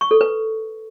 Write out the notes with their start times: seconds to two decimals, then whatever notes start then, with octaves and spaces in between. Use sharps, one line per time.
0.01 C#6
0.11 A4
0.21 B4